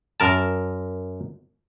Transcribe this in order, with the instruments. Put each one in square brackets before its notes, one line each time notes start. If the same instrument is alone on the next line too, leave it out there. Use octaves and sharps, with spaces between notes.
[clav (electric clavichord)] F#2 A#4 A5